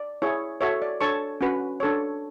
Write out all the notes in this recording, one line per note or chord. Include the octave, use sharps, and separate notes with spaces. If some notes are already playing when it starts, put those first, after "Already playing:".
Already playing: D5
E4 G#4 C#5
F#4 A4 C#5 E5
D5
D4 A4 C#5 A5 C#6
C#4 F#4 B4
D4 A4 C#5